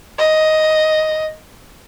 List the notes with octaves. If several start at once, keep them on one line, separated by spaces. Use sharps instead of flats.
D#5